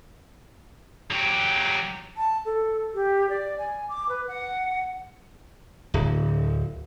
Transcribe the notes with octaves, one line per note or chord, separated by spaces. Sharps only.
F#3 G4
A5
A4
G4
D5
G#5
D6
B4
F#5
D1